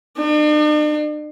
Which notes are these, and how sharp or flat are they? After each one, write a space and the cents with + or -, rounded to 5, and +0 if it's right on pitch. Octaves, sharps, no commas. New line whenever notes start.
D4 +45